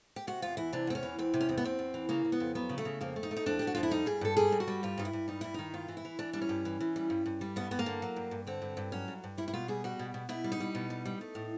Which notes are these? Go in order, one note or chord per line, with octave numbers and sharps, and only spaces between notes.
G4
C3 F#4
E2 F4
E3 E4
C3 D4
E2 C4
C#4
E3
E2 C4
C3
C#4
E2 C4
B3
E2 C4
E2
E3
C#3 A#3
C#3
B3
F2
F#3 B3
C#3
A3
C#3
F2 A#3
A3
D#4
A3
D#4
F2 D4
F2 G4
F#4
F2 F4
E4
G3 D#4
G2 G#4
G2 A4
G3 G#4
G2
F#4
G3
G2 F4
G2 D#4
E4
G2
G3 D#4
G2 E4
D#3 D#4
G2 F4
E3
E4
E3
E3 D4
G3 D4
C#4
G2
E3
E3
G3
G2
G2
G3
G2 B3
G2 B3
A#3
D3
F#3
G2
G2
D3 C4
G2
G2
F#3 C#4
G2
G2
G3 E4
E4
B2 F4
G3 G#4
G3 F#4
B2
B2
B2 E4
G3
D#4
G3
B2
G3
G3
A3
A2